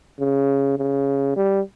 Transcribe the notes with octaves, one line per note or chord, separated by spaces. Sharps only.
C#3
C#3
G3